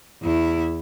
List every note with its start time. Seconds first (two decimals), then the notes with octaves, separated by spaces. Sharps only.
0.23 E2 E4